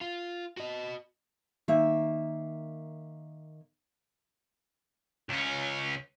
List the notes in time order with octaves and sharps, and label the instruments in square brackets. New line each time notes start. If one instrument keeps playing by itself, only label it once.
[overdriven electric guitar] F4
F#4 D#5
[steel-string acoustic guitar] D#3 A#3 E5
[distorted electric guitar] C#2 C#4